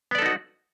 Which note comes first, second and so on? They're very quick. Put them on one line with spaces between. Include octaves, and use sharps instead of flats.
B3 D5 A4 D#4 F#4